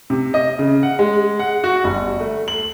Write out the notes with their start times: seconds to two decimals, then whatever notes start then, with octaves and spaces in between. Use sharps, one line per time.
0.10 C3
0.34 D#5
0.59 C#3
0.83 F#5
0.99 G#3
1.39 F#5
1.64 F#4
1.84 G1
2.20 A3
2.48 F#7